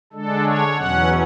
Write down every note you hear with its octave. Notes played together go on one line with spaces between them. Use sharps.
D3 G#3 D4 A4
C#5
E2 B2 F#3 C#4 F#5